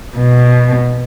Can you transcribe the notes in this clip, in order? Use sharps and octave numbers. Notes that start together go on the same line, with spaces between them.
B2